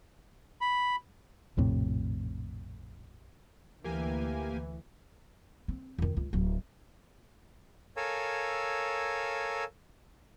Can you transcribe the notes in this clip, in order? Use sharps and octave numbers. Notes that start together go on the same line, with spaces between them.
B5
A#1 F2 A2 C3
D2 E3 A#3 G4 G#5
C4
F2 D#3
C#2
D1 F#3
A4 A#4 C#5 F5 G#5 E6